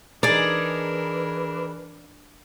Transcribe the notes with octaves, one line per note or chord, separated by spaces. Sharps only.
E3 D4 D#4 G#4 A#4 D5